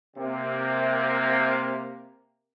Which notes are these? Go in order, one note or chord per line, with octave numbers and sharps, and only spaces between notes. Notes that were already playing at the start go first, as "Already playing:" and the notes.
C3 A#3